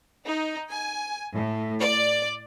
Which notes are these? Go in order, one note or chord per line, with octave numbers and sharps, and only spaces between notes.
D#4
G#5
A2
D5